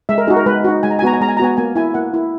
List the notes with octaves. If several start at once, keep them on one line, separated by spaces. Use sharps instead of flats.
G#3 E5
A#4
D#4 F#4 G#4
A#4
G#3 B4
D#4 F#4
G#3 G#5
A#5
G#5
B3 F#4 A#5
G#5
G#3 A#5
G#5
A#5
B3 F#4 G#5
A#3 G#5
E4 G#5
A#3 F#5
E4